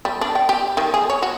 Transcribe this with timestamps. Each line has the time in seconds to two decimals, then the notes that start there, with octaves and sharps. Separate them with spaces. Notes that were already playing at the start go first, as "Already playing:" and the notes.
0.05 G3
0.21 D4
0.35 G5
0.49 G4
0.77 D#3
0.94 G#4
1.10 C#5
1.22 F#4